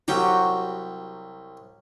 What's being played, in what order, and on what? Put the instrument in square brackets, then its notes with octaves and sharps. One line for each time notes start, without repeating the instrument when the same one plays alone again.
[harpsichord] C2 G5 A#5 [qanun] F#3 F#4 G4